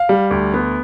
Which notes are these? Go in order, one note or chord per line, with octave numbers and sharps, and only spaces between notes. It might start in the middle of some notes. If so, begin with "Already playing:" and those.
Already playing: F5
G3
D2
B3